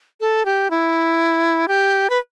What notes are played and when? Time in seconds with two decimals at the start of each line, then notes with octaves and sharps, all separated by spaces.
0.20 A4
0.45 G4
0.70 E4
1.68 G4
2.10 B4